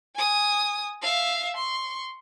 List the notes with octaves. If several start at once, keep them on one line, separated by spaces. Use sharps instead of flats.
G#5 D#6
E5 F5
C6 C#6